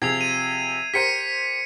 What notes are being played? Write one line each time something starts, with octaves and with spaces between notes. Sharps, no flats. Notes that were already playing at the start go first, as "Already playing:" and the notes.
C3 F3 G#4 G#6 C7 F7
D#7
G4 A#4 C5 B6 C#7 D#7